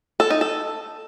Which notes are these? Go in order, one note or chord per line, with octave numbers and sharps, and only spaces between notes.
A4
D#4
A4